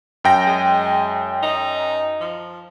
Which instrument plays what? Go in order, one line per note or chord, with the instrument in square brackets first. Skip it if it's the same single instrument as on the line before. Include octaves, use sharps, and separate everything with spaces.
[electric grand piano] F#2 G5 A#6
[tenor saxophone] G#3
D#4
F3